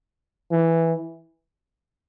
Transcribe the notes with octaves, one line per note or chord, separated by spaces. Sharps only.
E3